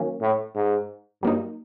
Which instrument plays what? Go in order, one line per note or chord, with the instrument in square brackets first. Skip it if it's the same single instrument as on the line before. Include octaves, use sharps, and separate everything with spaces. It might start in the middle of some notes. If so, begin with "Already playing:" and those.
Already playing: [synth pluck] D#3 F#3 A#3 C#4
[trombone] A2
G#2
[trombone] G2 [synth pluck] F#3 A#3 D#4